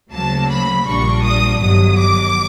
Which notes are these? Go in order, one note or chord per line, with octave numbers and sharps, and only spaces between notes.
D2 C#3 F#3 A#3 A5
B5
A#1 A#2 G3 A#3 D4 C#6
D#6
G1 G2 D#3 F#3 D#6
D6